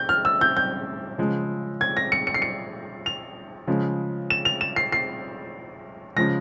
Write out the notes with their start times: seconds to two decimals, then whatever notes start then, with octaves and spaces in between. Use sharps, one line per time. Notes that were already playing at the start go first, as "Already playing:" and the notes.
Already playing: G6
0.09 F6
0.25 E6
0.41 G6
0.57 G6
1.18 C#3 F3 G#3
1.81 G#6
1.97 A#6
2.12 C#7
2.27 C#7
2.34 C7
2.42 C#7
3.06 F7
3.67 C#3 F3 G#3
4.30 E7
4.45 F7
4.61 E7
4.76 C7
4.92 C7
6.16 C#3 F3 G#3 A#6